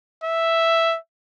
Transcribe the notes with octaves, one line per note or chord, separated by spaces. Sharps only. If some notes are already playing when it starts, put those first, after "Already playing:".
E5